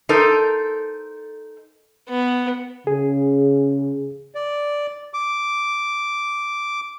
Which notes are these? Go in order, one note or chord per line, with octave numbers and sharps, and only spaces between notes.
D#4 A4 A#4 C5
B3
C#3 G#4
D5
D6